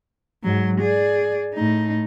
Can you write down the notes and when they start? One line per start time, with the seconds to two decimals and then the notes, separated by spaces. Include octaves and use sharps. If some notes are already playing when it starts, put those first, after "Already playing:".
0.43 G#2 F#3
0.80 G#4 D5
1.55 A2 D#4